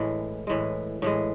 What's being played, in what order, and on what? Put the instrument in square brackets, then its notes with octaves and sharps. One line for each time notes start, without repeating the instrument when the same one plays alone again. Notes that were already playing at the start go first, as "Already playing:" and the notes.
Already playing: [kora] A2 E3 G#3
A2 E3 G#3
A2 E3 G#3